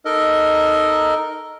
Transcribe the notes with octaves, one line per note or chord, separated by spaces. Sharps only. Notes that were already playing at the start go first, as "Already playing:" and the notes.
D#4 A4 A#4 D#5